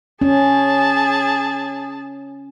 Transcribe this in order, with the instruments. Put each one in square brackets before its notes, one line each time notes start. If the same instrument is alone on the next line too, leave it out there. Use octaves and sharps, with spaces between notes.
[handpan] C#4 [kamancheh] G#4 A5